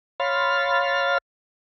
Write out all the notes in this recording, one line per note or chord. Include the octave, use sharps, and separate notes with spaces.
C#5 F5 B5 C6 F6 A6